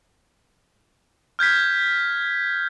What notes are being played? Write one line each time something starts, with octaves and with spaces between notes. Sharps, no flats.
F6 G6 G#6 B6